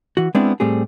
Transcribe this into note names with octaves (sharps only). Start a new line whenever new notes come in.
E3 F#4
G#3 B3 C4 D4 E4
A2 G3 A3 C4 G4 G#4